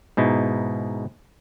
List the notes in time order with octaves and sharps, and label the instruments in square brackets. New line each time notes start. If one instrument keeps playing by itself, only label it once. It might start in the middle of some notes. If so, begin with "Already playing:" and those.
[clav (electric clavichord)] G#2 B2 D#4 E4